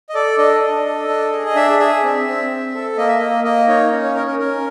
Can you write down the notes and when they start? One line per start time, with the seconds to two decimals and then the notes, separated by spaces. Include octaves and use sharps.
0.09 D#5
0.14 A4 D5
0.38 D4 D#5
0.61 D4
0.86 A4
1.08 D4
1.32 G#4
1.46 D#5
1.55 D4 E5
1.79 G#4 E5
2.04 C4
2.27 C4
2.50 C4
2.74 A4
2.97 A#3 D#5
3.08 E5
3.18 A#3 D#5
3.44 A#3 D#5
3.68 D#4 C#5
3.91 C#4
4.04 C#5
4.15 C#4 A#4
4.27 A#4
4.39 C#4 A#4